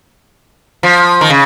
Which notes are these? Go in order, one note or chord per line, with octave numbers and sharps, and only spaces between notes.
F3
D#3
C#3